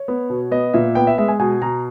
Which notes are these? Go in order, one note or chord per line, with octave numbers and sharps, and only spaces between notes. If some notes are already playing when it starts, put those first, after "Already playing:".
Already playing: C#5
B3
B2
B3 D#5
A#2 E5
B3 G5
E5
G#3 E5
G#5
B2 G#5
B2 A#5